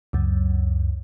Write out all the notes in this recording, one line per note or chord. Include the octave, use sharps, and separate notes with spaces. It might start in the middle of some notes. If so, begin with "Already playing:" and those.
C#2 F#2